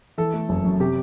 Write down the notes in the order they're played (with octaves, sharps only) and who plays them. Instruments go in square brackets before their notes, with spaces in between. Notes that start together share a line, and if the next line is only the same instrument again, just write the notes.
[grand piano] E3 A4
A3
F#1
F#2
C3 G4